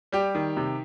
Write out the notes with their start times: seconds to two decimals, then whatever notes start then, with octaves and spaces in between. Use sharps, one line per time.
0.12 G3 G4
0.35 D#3
0.57 C3